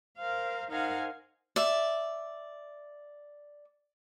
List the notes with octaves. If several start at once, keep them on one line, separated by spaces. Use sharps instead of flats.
A#4 C5 F5
D#4 A#4 C5 F5 F#5 G#5
D5 E5